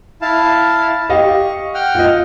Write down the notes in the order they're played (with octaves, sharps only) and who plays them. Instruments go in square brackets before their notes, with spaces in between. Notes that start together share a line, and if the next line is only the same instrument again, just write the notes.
[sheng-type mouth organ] E4 F5 A5
[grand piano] G4 D#5 F5 [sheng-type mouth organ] C#6
[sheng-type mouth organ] F#5 G5 F6
[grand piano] F4 D#5